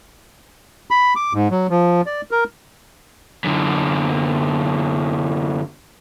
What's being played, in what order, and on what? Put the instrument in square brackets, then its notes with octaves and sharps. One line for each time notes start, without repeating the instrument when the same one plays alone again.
[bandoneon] B5
D6
G#2
F#3
F3
D5
A#4
[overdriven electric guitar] F#2 D3